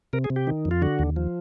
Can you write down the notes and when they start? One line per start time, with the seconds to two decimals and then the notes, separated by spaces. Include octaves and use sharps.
0.13 C3 A#4
0.24 G#4
0.30 C3
0.36 G4
0.47 D#3
0.65 F2
0.71 F4
0.82 D3 F#4
0.99 D#2
1.16 F3